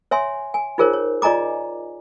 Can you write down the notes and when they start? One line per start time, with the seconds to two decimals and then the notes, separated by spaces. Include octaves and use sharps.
0.11 C#5 E5 G#5 C6
0.54 G#5
0.78 D#4 F4 G#4 A#4 C5 C#5
0.93 C#5
1.22 F4 D5 D#5 G#5 A#5 D6